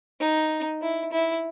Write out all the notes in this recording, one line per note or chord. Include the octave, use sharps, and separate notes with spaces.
D#4
E4
E4